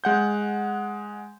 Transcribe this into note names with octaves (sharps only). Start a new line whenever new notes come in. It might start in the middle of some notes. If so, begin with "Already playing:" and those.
G#3 F#5 G6